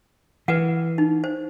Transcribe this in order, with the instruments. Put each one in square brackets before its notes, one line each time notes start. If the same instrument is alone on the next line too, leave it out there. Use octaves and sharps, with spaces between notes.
[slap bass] E3 [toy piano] B4 F#5
[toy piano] D#4
C5